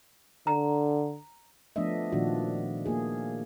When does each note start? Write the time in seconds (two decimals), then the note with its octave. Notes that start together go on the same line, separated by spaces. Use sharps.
0.47 D3 A#5
1.76 F3 A3 B3 D4 D#5 E5
2.12 A#2 D#3 F3 D4 F4 F#4
2.86 A#3 F4 G#4